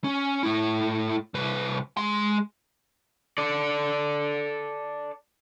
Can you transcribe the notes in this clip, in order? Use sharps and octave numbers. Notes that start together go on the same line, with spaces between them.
C#4
A2 E4
C2 B4
G#3 C6
A4 D5